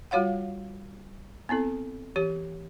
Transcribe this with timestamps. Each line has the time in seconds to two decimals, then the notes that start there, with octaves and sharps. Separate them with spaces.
0.11 G3 F4 F#4 C#5 F5 F#5
1.49 B3 C4 E4 A4
2.16 E3 G4 C#5